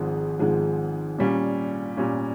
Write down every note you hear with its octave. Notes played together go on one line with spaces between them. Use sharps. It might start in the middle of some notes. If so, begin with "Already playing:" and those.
Already playing: G#1 G#2 F3 G#3
G#1 G#2 F3 G#3
A#2 G3 C#4
A#2 G3 C#4